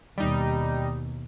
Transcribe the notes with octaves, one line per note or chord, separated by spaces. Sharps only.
D#2 B2 G3 D#4